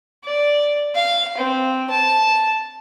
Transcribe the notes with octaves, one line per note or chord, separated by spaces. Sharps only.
D5
F5
C4
A5